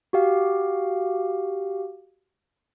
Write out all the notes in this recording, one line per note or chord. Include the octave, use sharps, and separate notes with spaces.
F#4 G4 F5